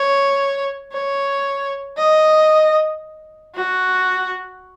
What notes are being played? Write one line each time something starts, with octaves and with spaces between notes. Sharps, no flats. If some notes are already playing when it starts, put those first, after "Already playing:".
Already playing: C#5
C#5
D#5
F#4